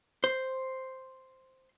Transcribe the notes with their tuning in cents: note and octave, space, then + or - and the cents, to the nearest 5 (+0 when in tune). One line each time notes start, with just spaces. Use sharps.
C5 +0